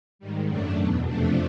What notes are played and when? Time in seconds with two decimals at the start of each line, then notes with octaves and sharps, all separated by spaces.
0.19 G#2 D#3 G3
0.47 F#2 C#3 F#3 A3 D4
0.76 E2 B2 F#3
1.05 F2 C3 F3 A3 D4